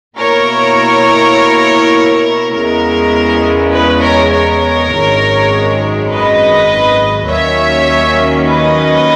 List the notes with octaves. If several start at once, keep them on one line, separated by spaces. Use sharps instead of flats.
B2 A#3 E4 A#4 C#5
E2 C#3 G#3 B3 E4 A#4
B4
A#4 C#5
A#4 C#5
G#1 F#2 D#3 G#3
B4 D#5
D#2 D#3 F#3 A#3 C#4 C#5 E5
B4 D#5